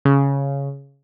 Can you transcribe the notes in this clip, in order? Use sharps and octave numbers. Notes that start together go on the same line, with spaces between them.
C#3